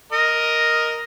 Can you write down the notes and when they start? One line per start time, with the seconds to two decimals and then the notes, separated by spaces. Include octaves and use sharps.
0.12 A#4 D#5